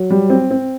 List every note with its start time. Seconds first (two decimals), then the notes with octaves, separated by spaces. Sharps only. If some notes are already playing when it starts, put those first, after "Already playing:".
Already playing: F#3
0.10 G3
0.30 C4
0.50 C4